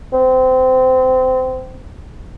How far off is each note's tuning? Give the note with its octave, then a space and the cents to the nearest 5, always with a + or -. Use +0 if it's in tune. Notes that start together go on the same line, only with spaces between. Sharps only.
C4 -25